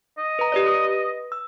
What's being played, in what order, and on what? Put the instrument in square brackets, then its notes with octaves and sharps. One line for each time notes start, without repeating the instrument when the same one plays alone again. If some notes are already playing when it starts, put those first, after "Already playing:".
[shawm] D#5
[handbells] B4 A#5
G4 B4 D5
B4 D#6
E6